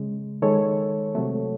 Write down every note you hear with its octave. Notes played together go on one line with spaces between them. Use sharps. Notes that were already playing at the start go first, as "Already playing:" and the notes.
Already playing: C#3 G#3
D#3 G#3 A4 C#5
C3 F#3 A3